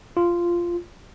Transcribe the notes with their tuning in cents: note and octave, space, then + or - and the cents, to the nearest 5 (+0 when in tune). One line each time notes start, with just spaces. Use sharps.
F4 -10